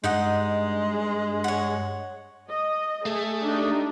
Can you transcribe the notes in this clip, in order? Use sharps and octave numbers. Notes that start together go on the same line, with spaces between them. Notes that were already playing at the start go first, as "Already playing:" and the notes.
G2 G#3 D#4 D#5 F#5
C#5 F#5
D#5
A3 G#4
D4 D#4 G4